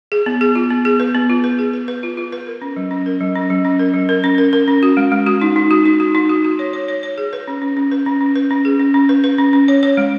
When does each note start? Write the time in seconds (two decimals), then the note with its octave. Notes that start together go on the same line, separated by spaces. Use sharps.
0.12 G#4
0.26 B3
0.41 G#4
0.55 F4
0.70 B3
0.85 G#4
1.00 B4
1.15 B3
1.30 F4
1.44 B4
1.59 G#4
1.73 B4
1.88 B4
2.03 F4
2.17 F4
2.32 B4
2.47 A#4
2.62 C#4
2.76 F#3
2.91 C#4
3.06 A#4
3.21 F#3
3.35 C#4
3.50 F#3
3.65 C#4
3.79 A#4
3.94 F#3
4.09 A#4
4.24 C#4
4.38 A#4
4.53 A#4
4.68 C#4
4.83 F#4
4.97 G#3
5.12 G#3
5.27 F#4
5.41 D#4
5.56 D#4
5.71 F#4
5.86 D#4
6.00 F#4
6.15 D#4
6.29 F#4
6.44 F#4
6.59 C#5
6.73 C#5
6.88 C#5
7.03 C#5
7.18 G#4
7.33 B4
7.48 C#4
7.62 C#4
7.77 C#4
7.92 B4
8.06 C#4
8.21 C#4
8.35 B4
8.50 C#4
8.65 G#4
8.80 C#4
8.94 C#4
9.09 B4
9.24 B4
9.38 C#4
9.53 C#4
9.68 C#5
9.83 C#5
9.97 G#3